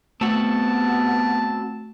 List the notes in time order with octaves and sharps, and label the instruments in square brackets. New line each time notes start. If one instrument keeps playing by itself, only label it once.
[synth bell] A3 [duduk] B3 [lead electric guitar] C4 F#4 [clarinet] A5